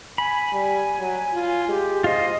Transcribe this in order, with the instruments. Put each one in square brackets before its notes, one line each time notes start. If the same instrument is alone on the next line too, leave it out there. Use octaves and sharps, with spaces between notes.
[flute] G#5 [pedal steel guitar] B5
[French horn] G3
F#3
F4
[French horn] G#3 [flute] G4
[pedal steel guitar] F4 C5 [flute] D#5